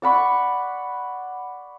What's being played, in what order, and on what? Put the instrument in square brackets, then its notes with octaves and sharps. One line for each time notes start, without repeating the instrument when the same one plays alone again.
[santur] D5 F#5 B5 C#6